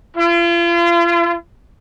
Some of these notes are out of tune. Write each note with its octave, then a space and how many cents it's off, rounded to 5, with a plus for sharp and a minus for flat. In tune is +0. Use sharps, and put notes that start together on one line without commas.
F4 -40